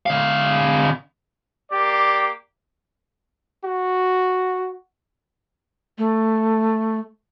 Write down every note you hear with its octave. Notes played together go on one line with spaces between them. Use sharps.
D3 F5
A#3 G4 D5
F#4
A3